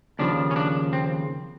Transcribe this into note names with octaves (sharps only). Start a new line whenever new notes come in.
D#2 C#3 F3 D4
C#4
D4
C4